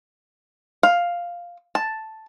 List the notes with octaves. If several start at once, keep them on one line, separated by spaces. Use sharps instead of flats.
F5
A5